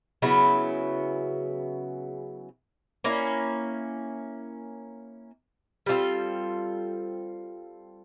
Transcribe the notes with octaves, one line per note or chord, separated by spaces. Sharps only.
C#3 F#3 B3 E4
A#3 C#4 E4
G3 C4 F4 A4